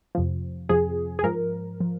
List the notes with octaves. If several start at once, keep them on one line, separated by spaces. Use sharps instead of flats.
F2 C3 F3
F2 C3 F3 G#4
G#4
G#2 F3 A#4
F3